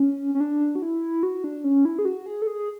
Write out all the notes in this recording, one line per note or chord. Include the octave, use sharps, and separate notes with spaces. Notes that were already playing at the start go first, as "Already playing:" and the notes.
Already playing: C#4
C#4
D4
F#4
E4
F#4
D4
C#4
E4
G#4
F#4
G#4
A4
G#4